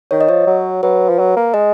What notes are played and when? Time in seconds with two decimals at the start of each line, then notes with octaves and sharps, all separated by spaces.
0.11 D#3 C#5
0.21 D#5
0.28 F3 C#5
0.47 F#3
0.83 F#3 B4
1.09 F3
1.19 F#3
1.37 A#3
1.54 G#3 D#5